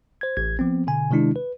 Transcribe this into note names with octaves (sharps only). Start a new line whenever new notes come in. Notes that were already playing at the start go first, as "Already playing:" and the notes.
C5 G#6
A1 G#6
F3 B3 C4
B2 D3 G#5
C3 D#3 G#3 D4 E4
B4